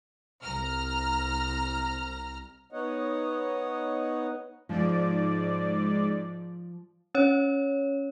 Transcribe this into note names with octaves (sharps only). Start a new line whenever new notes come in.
C2 A#5 F6
B3 D#4 C#5 D#5 F#5
G#2 F3 D5
C#4 C#5